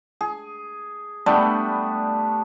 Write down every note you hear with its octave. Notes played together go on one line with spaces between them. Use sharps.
G#4
G3 A3 B3 D4